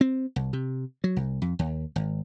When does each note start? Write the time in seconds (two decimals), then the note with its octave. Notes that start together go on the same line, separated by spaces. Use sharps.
0.01 C4
0.36 C2
0.53 C3
1.04 F#3
1.16 C2
1.42 F2
1.59 D#2
1.96 G#1